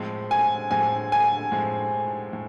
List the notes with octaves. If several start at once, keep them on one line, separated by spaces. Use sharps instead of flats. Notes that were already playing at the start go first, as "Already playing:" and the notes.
Already playing: A2 F3 G#3 C4
G#5
A2 F3 G#3 C4 G#5
G#5
A2 F3 G#3 C4
A2